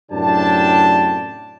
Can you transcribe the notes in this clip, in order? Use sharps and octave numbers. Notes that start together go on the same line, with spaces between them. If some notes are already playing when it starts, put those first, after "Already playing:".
F#2 A2 C3 D4 G5 A5